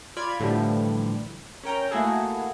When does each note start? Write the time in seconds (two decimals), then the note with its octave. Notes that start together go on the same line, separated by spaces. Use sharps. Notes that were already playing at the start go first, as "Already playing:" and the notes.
0.17 F4 D5 B5 F6 G#6
0.40 A2 D3 E3 F3 G3
1.63 C#4 A#4 G5 A#5
1.91 A3 A#3 E4 F#4 G#4 A4